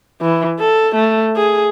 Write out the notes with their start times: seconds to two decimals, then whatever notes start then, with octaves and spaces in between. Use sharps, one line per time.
0.22 E3
0.60 A4
0.95 A3
1.36 G#4